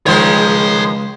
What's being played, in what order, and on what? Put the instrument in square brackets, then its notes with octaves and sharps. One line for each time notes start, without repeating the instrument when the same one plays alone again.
[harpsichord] C#2 [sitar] D#3 F3 G#3 [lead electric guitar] C#5 C6